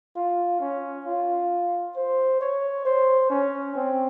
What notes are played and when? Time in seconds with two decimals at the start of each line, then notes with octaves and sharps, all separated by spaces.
0.16 F4
0.60 C#4
1.06 F4
1.96 C5
2.41 C#5
2.85 C5
3.30 C#4
3.75 C4